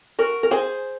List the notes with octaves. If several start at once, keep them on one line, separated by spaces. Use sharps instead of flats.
F#4 A#4
A#4
G#4 C5